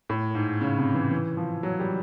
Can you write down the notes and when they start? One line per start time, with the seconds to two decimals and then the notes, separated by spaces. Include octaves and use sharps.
0.09 A2
0.35 G#2
0.61 C#3
0.78 C3
0.95 E3
1.11 E3
1.37 F3
1.63 F#3
1.80 G3